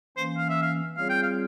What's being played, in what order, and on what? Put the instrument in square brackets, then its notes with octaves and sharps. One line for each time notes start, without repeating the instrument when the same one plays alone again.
[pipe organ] E3 A#3 C#4 [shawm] C5
[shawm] F5
E5
F5
[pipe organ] G3 C4 F4 G#4 C#5 [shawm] F5
[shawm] G5
F5